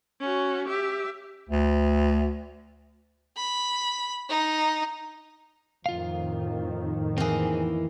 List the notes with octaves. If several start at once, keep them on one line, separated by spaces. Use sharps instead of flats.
C#4 F#4
G4 E5
D2
B5
D#4
F2 A2 D#3 F4 F5
E3 A#3 C4 G#4